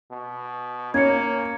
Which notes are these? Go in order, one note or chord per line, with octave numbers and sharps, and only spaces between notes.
B2
A#3 C#4 G#6 C#7